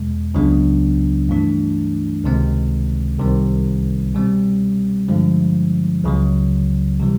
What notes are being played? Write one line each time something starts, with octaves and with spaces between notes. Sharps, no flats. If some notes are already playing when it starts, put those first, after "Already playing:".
Already playing: E2 B2 G#3
C#2 C#3 F#3 B3 D4
G2 E3 A3 D4
C#2 C3 D#3 G#3 C4
C2 C3 D#3 G3 C4
B2 G3 C4
G2 D3 F3 G#3
C#2 C#3 F#3
C3 E3 G3